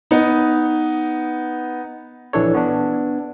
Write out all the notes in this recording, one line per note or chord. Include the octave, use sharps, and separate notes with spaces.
B3 D#4
A#1 E3 D4 A4 C#5
B3 D4